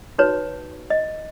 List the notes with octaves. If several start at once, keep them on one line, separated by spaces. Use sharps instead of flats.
D#4 F#4 B4 C#5
D#5